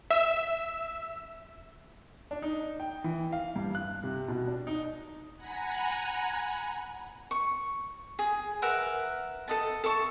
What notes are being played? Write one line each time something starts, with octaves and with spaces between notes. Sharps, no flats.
E5 E6
D4
D#4
G5
E3
F5
G2
F#6
C3
B2
D4
D#4
F#5 G#5 A#5 B5 B6
C#6
G#4
A#4 B4 E5 F#5
A4 D#5 A5
A4 E5 C#6